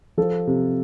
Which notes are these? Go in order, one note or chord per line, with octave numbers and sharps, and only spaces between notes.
F3 A4
C3